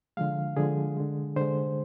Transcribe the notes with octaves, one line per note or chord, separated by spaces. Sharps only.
D3 F3 G#3 F5
D3 F3 G#3 G#4
D3 G#3
D3 G#3 C5